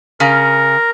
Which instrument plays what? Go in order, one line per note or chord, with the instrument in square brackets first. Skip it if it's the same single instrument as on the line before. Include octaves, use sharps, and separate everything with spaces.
[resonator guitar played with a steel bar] C#3 [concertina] A#4